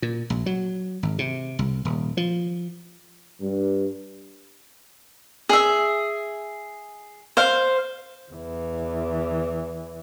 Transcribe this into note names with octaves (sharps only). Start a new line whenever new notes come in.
A#2
A#1
F#3
G#1
C3
C2
D#1
F3
G2
G#4 E5
C5 F5
E2 E3